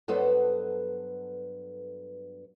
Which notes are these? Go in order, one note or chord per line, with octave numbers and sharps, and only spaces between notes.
G2 F#3 B3 A4 B4 C5